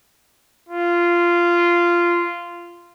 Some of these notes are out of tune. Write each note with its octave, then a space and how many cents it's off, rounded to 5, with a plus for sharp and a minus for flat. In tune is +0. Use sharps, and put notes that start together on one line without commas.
F4 -10